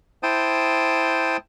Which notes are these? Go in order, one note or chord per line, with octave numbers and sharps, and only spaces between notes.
E4 C5 G5 A5 D#6